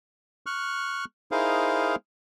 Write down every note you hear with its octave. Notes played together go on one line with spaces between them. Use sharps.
C#6 F6 F#6
D#4 E4 G#4 A#4 C5 F5